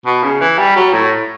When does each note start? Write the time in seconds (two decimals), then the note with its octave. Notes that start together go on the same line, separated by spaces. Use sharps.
0.06 B2
0.23 C#3
0.41 E3
0.58 G3
0.76 F#3
0.93 A2